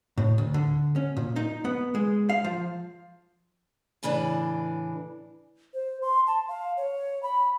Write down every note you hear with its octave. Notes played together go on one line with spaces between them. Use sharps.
A2
D2
D3
C#4
A#2
D#4
B3
G#3
F5
F3
A2 C#3 E3 D4
C5
C6
A5
F5
C#5
B5